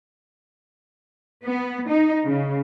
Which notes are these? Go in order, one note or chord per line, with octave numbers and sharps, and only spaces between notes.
B3
D#4
C#3